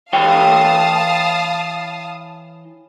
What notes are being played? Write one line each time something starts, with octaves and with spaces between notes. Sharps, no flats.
E3 C#5 F5 G5 A5 D#6